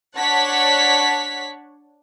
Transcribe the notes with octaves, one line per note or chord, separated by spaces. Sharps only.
D4 C#5 F#5 A5 C#6 B6